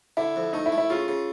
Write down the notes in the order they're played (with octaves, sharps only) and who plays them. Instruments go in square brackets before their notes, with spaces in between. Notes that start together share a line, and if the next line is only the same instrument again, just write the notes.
[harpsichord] D3 [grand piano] E4
[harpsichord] F2
[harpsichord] A3 [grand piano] D#4
[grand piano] E4
[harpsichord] A3
[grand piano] E4
[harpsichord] C#3 [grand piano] F4
[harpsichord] C#3